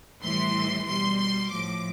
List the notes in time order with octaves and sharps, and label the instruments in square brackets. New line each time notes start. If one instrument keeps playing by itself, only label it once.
[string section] A2 E3 G3 C6
B2 G3 C6
C6
A2 F3 D6